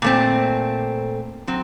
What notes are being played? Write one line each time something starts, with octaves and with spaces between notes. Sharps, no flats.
A#2 A3 C4
F#3 C4